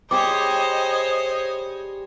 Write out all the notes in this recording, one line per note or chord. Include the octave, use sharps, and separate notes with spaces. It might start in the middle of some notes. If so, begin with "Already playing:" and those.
G3 G4 G#4 C5 C#5 D#5 D6